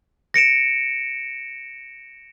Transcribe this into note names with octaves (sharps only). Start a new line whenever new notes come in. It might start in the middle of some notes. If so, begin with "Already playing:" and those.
A#6 C#7 D7 E7